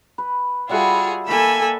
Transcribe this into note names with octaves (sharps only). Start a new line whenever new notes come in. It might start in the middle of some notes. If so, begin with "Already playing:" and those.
B4
G3 F4 F#4 G#4 E5 F#5
A#3 A4 G#5 B5 E6